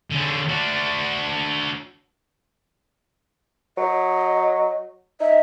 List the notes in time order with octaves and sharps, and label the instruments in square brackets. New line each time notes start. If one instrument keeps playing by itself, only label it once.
[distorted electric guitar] D3 C#4
D4 F#4
[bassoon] F#3 [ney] D#5
[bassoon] D#4 [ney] E5